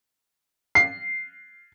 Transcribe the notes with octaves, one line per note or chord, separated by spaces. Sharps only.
C7